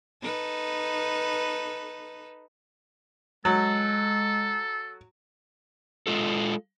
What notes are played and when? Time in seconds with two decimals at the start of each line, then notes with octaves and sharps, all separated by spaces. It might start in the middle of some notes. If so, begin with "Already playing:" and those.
0.22 D#4 A4 B4
3.45 F#3 G#3 A4
6.07 G#3 F4 A4